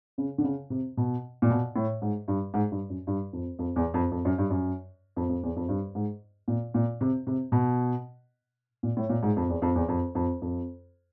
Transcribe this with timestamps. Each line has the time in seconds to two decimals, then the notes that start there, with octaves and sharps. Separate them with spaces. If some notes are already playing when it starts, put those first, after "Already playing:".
0.18 C#3
0.38 D3
0.44 C#3
0.70 C3
0.97 B2
1.42 A#2
1.50 B2
1.76 A2
2.02 G#2
2.28 G2
2.54 G#2
2.71 G2
2.90 F#2
3.07 G2
3.33 F2
3.59 F2
3.76 E2
3.94 F2
4.11 F2
4.25 F#2
4.38 G2
4.50 F#2
5.16 F2
5.29 F2
5.43 E2
5.56 F2
5.69 G2
5.95 G#2
6.48 A#2
6.74 A#2
7.01 C3
7.27 C3
7.52 B2
8.83 A#2
8.97 A2
9.09 A#2
9.23 G#2
9.36 F2
9.49 E2
9.62 F2
9.75 E2
9.88 F2
10.15 F2
10.42 F2